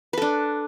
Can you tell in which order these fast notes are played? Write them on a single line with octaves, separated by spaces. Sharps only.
B4 A4 D4